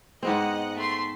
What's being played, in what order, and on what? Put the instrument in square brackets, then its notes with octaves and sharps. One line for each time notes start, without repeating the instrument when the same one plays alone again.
[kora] G#2 B3 C4 [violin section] D#5 F#5
[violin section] A3 C6